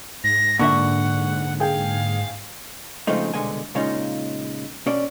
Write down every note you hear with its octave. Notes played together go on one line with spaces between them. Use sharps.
G#2 A#6
A#2 D3 E5 F#5 C#6
G#4 F5 G5
C#3 F3 G#3 A3 C4 D#4
C2 G2 B2 D3 G#3 G#5
A#2 C#3 G#3 C#4 D#4 F4
B2 C#4 D5